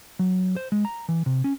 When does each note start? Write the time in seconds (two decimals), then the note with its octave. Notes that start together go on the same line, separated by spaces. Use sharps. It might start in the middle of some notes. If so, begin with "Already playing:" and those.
0.19 F#3
0.56 C5
0.72 G#3
0.85 A#5
1.09 E3
1.26 C3
1.44 C#4